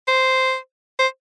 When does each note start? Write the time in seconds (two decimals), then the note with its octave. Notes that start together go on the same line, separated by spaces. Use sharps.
0.08 C5
0.99 C5